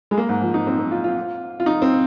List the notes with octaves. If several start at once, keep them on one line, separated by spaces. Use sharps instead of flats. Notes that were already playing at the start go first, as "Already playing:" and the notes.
G#3
A#3
G#2
F3
D#4
C4
C4
F4
F4
F4
D#4
C4